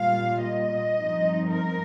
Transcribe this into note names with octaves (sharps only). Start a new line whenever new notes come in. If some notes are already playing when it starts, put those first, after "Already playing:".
Already playing: A#2 G3 A#3 F4 F5
D#5
G2 F3 C4 D#4
A#4